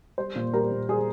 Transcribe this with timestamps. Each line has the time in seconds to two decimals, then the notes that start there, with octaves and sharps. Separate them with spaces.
0.18 G3 C5
0.35 A#2
0.53 G3 A#4
0.71 A#2
0.89 G3 G#4